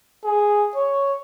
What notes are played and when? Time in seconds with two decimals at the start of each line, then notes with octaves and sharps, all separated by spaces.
0.25 G#4
0.76 C#5